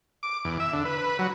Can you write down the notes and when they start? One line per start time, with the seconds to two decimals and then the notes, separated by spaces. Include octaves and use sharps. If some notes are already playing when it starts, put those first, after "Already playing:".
0.23 D6
0.45 E2
0.60 E5
0.73 D3
0.85 B4
0.98 B4
1.19 F#3